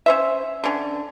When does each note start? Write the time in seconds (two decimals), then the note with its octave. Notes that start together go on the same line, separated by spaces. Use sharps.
0.06 C#4 C5 E5
0.64 D3 C#4